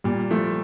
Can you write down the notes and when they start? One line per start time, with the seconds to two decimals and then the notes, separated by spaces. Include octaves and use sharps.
0.04 A#2 G3
0.31 F3 A3